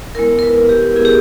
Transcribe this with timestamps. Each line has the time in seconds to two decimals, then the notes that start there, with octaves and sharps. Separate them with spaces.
0.15 G#3 B3 E4 A#4
0.39 A#4
0.43 B4
0.69 G4
0.96 G#3 B3 E4 G#4
1.05 G4